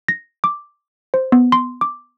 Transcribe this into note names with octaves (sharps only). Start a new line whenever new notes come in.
A#6
D6
C5
B3
C6
D6